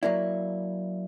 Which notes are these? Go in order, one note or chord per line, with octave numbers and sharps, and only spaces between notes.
F#3 A#3 E4 D5